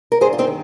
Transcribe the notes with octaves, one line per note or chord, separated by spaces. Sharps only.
A#4
G2 G#4 C5
F4
C4 D#4
D#3